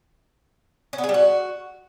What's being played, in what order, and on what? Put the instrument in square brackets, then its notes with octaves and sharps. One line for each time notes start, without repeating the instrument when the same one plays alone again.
[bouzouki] C#4
B3
G#4
G3
F#4